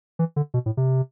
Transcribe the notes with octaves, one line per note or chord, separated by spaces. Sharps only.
E3
D3
B2
A2
C3